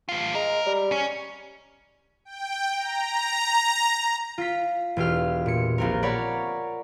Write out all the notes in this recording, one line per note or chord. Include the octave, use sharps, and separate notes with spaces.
A2 F4
G#3 A#4
G3
C#4
G5
A#5
F4 B6
E1 F4 G4 F6
A#2 C#7
A#1 C4 A#4
A#4 C#5 D5 F#5 B5